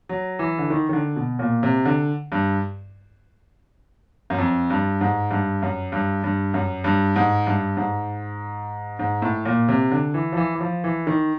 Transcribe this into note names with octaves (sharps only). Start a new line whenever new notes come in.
F#3
E3
D3
D#3
D#3
D3
B2
A#2
C3
D3
G2
F#2
F2
G2
G#2
G2
F#2
G2
G2
F#2
G2
G#2
G2
G#2
G#2
A2
A#2
C3
D3
E3
F3
E3
E3
F3
E3
D#3